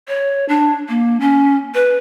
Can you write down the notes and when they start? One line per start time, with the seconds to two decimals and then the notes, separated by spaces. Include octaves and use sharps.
0.08 C#5
0.49 D4
0.89 A#3
1.20 C#4
1.75 B4